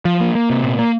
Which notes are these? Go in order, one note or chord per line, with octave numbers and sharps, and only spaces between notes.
F3
A#3
A#3
C3
A#2
A#3